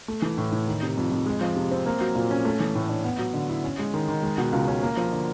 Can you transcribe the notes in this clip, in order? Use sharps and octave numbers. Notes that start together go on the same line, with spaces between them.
A3
E3
A2
A2
D#3
C3
F2
F2
G#3
F3
C3
C4
A#3
F#3
A#2
C#4
A3
E3
A2
D4
B3
F#3
D3
E4
C#4
G#3
D#3
D#3
G#3
B2
C#2
C#4
A#3
F3
D3